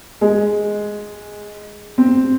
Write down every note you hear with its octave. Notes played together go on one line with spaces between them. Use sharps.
G#3
C4